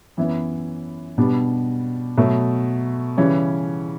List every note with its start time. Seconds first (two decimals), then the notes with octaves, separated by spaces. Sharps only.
0.17 F#2 E3 B3 E4
1.18 B2 G3 B3 D4
2.17 B2 F#3 A3
3.17 C#3 E3 G3 C#4